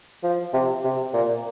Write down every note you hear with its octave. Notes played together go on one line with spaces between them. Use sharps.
F3
C3
C3
A#2